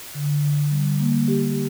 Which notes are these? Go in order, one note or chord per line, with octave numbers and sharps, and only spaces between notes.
D3
D3
G3
A#3
G4